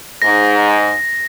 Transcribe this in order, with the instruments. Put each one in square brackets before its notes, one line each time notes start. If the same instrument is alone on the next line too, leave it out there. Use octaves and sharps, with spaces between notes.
[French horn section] G#2 [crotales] A#6